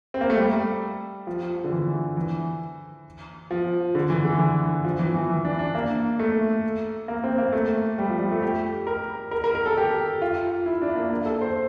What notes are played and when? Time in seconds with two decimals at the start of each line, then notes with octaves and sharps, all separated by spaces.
0.14 C4
0.21 A#3
0.30 A3
0.37 G3
1.27 F3
1.64 D3
1.71 E3
2.17 E3
3.51 F3
3.95 D3
4.10 E3
4.25 D3
4.39 E3
4.84 F3
4.99 E3
5.14 E3
5.30 E3
5.45 D4
5.59 D4
5.75 A#3
6.19 A3
7.08 A#3
7.24 C4
7.38 A#3
7.53 A3
7.98 G3
8.10 F3
8.20 G3
8.32 A3
8.42 G4
8.87 A#4
9.31 A#4
9.44 A#4
9.55 A#4
9.66 A4
9.77 G4
10.22 F4
10.66 E4
10.82 D4
10.95 A#3
11.10 A#3
11.26 A4
11.41 C5